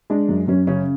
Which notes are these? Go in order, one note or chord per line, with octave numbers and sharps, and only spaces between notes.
G#3 D4
F#2
F#2 C#4
C#3 C#4